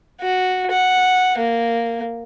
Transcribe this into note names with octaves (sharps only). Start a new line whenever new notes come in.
F#4
F#5
A#3